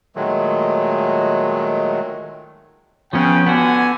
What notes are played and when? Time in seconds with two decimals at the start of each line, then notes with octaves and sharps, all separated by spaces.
0.16 A#2 D#3 F#3 G#3 A3
3.13 C#3 F3 B3 C#4 G5
3.46 D3 B3 F#4 G#5